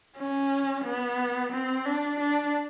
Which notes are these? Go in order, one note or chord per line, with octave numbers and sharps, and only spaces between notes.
C#4
B3
C4
D4
D4